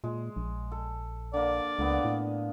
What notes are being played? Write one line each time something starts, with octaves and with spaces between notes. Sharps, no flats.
A#2 G#3
A#1
A4
D3 A#3 D5
C#2 D3 A#3 B3
A2